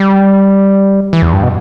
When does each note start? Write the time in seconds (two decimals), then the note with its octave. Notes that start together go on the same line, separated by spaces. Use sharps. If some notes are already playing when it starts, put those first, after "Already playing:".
Already playing: G3
1.13 E3
1.22 E2
1.33 G2
1.43 B2